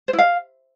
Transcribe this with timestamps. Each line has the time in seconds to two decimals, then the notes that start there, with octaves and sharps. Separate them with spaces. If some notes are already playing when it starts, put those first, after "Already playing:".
0.08 C5
0.13 E4
0.18 F5